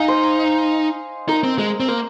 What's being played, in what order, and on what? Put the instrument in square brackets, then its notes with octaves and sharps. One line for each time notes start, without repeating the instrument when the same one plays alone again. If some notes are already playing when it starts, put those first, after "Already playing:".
Already playing: [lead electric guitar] D#4 [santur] D#5 F5 G#5 A#5
[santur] C5
[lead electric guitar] D#4 [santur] A#4
[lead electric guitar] C4
[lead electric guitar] G#3 [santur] A#4
[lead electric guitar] C4
[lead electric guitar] A#3 [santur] C5